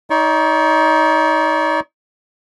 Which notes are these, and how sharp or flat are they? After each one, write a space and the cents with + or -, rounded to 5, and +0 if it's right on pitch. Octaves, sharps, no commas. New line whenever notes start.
D#4 +25 D5 -40 C#6 -35